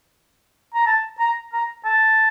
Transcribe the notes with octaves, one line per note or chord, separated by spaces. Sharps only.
A#5
A5
A#5
A#5
A5